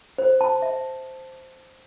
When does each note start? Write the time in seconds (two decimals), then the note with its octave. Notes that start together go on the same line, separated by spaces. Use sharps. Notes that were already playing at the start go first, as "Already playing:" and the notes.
0.18 C5
0.41 A5
0.62 E5